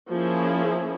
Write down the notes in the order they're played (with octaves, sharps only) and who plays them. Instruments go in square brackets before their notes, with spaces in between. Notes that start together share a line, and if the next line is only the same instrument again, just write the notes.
[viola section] F3 A#3 C#4 E4 G#4